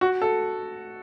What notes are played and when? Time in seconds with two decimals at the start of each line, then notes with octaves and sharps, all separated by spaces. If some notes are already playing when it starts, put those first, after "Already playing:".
0.01 F#4
0.22 A4